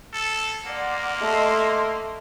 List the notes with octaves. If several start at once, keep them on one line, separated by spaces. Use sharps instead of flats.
A4
A#3 D5 F#5 C6
A3 D#5 C6